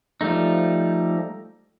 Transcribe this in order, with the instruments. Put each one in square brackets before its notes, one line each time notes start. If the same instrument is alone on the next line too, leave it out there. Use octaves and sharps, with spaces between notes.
[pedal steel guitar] F3 G3 A3 D#4